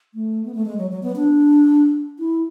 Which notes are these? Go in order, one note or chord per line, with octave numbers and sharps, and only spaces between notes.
A3
B3
A3
G#3
F#3
F#3
B3
D4
E4